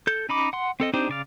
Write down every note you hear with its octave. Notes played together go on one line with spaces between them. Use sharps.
A4 G6
C#4 D#4 B5 D6
F#5 C6
C4 A4 D#5
C4 D4 D#4 G4 C5
C#3 D5 F5